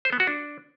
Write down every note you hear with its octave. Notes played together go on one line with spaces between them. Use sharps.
C5
B3
F#4
D4